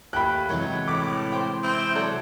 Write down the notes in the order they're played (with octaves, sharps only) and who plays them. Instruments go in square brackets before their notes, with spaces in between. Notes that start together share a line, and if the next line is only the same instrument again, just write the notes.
[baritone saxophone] D#2 [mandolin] A3 G5 [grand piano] B5 F#6
[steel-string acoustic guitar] C3 E3 G#3 [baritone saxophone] F#3
[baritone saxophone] A2 [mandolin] B5 [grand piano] D6
[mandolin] C5 G5
[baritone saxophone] C4 [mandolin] E4
[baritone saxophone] F#3 [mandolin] A4 D5